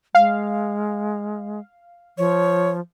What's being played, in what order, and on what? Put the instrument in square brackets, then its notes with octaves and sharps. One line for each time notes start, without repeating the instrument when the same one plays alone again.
[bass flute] G#3 [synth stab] F5
[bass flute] F3 [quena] C#5